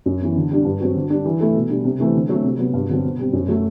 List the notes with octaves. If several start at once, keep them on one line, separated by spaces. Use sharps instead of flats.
F#2
E3 B3
D3
G3 D4
G2
F#3 C4 F#4
D3
G3 D4
E3
A3 E4 A4
B2
G3 D4
C3
E3 A3 C4
D3
F#3 A3 C4
C3
F#3 B3
G2
D3 F#3 C4
B2
G3 C4
F#2
F#3 A3